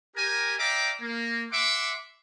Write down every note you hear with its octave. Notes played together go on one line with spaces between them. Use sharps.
G4 A#4 G#5
D5 E5 F5 G5 A#5 D6
A#3
E5 F#5 C6 D6